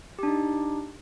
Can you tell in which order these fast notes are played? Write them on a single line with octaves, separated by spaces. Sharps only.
G4 D4 D#4